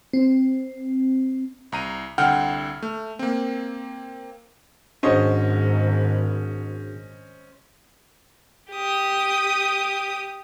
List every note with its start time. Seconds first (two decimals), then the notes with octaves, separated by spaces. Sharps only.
0.13 C4
1.72 C2 A#5 D#7
2.18 C2 D3 F#5 G5 F6
2.83 A3
3.19 A#3 C4
5.03 G#1 G#2 C#4 D4 F#4 G#4 C5 D#5
8.71 G4 D#6